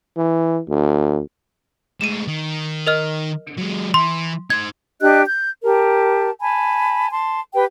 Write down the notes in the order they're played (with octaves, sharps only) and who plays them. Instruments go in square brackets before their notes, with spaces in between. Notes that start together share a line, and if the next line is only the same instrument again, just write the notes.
[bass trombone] E3
D2
[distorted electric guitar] A2 G#3 [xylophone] D#7 E7
[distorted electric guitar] D#3
[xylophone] A#4 D#5 F6
[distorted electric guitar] F#3 G#3
[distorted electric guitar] E3 [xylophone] C6
[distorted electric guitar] D#4 C5 [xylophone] G#6
[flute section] D4 G4 D#5 F#6
G6
G4 A#4 A5
G#5 A5 B5
A5 C6
G4 B4 G5